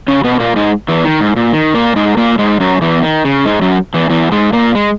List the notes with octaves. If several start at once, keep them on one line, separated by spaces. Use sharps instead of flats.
C#3 C#4
B2 B3
B3
A#2 A#3
G#2 G#3
E2 E3
D#3
G#2
A#2
D#3
A#2 A#3
G#2 G#3
A#2 A#3
G#2 G#3
F#2 F#3
E2 E3
D#3
C#3
G#2 G#3
F#2 F#3
E2 E3
E2 E3
G#2 G#3
A#2 A#3
G#3